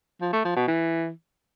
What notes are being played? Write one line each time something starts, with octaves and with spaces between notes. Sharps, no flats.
F3
A3
F3
B2
E3